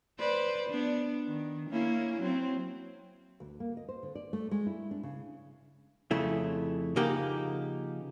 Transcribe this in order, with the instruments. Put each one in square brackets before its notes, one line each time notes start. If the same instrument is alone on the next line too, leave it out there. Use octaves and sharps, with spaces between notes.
[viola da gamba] B4 C5 D5
B3 D4
D#3
A#3 C#4 E4
F#3 C4
[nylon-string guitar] D2
A#3
D#5
C5
D3
D5
A3
G#3
E4
D4
C#3
[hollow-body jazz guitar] F2 C#3 A3 E4
C#3 F3 A#3 D#4 G4 F#5